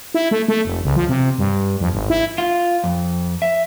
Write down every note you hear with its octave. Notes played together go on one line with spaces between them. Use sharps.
E4
A3
A3
F1
C#2
F3
C3
G2
F2
G#1
E4
F4
F2
E5